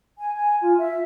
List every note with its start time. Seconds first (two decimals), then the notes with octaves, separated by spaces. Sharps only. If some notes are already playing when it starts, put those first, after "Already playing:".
0.18 G#5
0.35 G#5
0.62 F4
0.78 E5